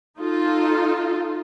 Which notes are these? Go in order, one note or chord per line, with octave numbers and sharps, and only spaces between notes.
D#4 F4 A4